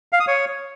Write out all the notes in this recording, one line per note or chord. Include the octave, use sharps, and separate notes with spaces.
F5
D#6
C#5